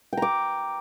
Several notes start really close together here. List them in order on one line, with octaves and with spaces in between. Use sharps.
G5 A#5 D6